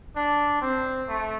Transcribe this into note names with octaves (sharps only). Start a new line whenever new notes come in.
D4
C4
A3